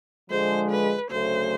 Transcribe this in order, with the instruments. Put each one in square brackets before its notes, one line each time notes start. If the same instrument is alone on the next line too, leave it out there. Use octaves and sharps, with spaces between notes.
[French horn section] D3 F3 G#3 [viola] C5
[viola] B4
[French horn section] D2 C#3 F#3 A3 [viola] C5